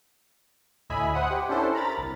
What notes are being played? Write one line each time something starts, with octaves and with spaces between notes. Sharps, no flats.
D2 A2 D#5 E5 G#5 B5
C5 F#5 D#6
G4
C#4 D4 E4 A4 C5
A#4 A#5 B5 A6
C2